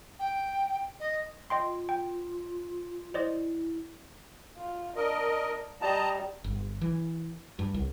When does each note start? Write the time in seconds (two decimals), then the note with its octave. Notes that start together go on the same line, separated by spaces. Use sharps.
0.19 G5
1.00 D#5
1.50 F4 D#5 G5 C6
1.89 G5
3.14 E4 C5 D5 D#5
4.58 F4
4.96 D4 A#4 D#5
5.82 G3 D#5 A5 A#5
6.44 G1
6.81 E3
7.59 G2
7.74 C2